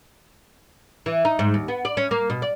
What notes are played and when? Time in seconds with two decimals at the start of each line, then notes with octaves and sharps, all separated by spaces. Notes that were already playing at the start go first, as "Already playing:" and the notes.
1.06 E3
1.25 D#4
1.39 G#2
1.54 D#2
1.68 B3
1.85 D5
1.97 C#4
2.11 A#3
2.30 B2
2.42 D5